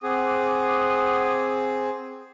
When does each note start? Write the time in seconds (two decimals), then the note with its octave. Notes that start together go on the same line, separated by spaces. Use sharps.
0.03 C4 G#4 F#5 D6 D#6